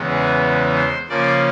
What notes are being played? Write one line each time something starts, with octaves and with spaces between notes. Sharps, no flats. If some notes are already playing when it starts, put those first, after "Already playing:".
Already playing: E2 C#3 E3 G#3 B3
G#4
C5
C#3 F3 A#3 C#4 D5